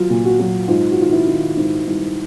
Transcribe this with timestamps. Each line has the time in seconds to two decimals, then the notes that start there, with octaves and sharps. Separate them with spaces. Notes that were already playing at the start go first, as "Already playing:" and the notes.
Already playing: F#3 F4
0.10 A#2
0.25 F#4
0.39 F#3
0.68 G#2 F4
0.91 F#4
0.98 D#3 F4
1.12 E4
1.27 D#3
1.56 G#2 D#4
1.86 G3 E4